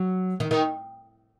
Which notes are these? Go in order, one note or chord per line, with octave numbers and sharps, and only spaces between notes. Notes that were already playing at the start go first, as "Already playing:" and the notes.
Already playing: F#3
D#3
D#3